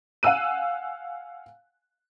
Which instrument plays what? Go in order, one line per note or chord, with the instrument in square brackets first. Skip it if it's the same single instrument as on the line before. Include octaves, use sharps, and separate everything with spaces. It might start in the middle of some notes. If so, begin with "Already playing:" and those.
[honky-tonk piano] F5 F#5 G#5 E6 F#6 D#7